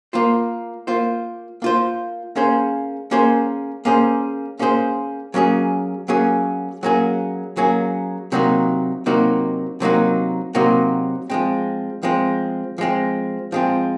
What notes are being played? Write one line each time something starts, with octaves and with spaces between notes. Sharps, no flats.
A#3 F4 C5
A#3 F4 C5
A#3 F4 C5
A#3 C#4 G#4 C5
A#3 C#4 G#4 C5
A#3 C#4 G#4 C5
A#3 C#4 G#4 C5
F#3 A#3 C#4 G#4
F#3 A#3 C#4 G#4
F#3 A#3 C#4 G#4
F#3 A#3 C#4 G#4
C3 F#3 A#3 D#4 F#4
C3 F#3 A#3 D#4 F#4
C3 F#3 A#3 D#4 F#4
C3 F#3 A#3 D#4 F#4
F3 G#3 C4
F3 G#3 C4
F3 G#3 C4
F3 G#3 C4